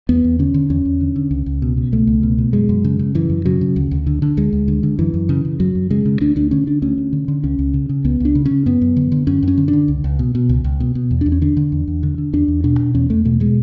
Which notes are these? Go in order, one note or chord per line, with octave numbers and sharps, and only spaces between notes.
E2 B3
E2
D3 C#4
D3
E2 C#4
E2
D3
D3
C#2
C#2
B2
B2
C#2 A3
C#2
B2
B2
F#2 G#3
F#2
C#3
C#3
F#2 E3
F#2
C#3 F#3
C#3
D2
D2
D3
D3
D2 G#3
D2
D3
D3
F#2 E3
F#2
C#3
C#3
F#2 F#3
F#2
C#3 G#3
C#3
D2 D4
D2 D4
D3 C#4
D3 D4
D2 C#4
D2
D3
D3
C#2 C#4
C#2
C#3
C#3
C#2 B3
C#2 D4
C#3
C#4
C#3
F#2 B3
F#2
D3
D3
F#2 C#4
F#2
C#4
D3
D4
D3
C#2
C#2
B2
B2
C#2
C#2
B2
B2
E2
E2 D4
C#4
D3 D4
D3
E2
E2
D3
D3
E2 D4
E2
B2 D4
B2
E2 C#4
E2 A3
B2 A3
B2 G#3